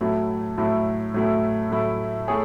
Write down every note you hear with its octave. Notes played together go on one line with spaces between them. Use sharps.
A2 F#3 A3 E4
A2 F#3 A3 E4
A2 F#3 A3 E4
A2 F#3 A3 E4
A3 E4 G#4 C#5